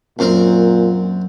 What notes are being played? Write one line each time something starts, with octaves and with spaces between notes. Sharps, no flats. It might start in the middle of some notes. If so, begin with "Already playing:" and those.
F#2 A#2 C4 A#4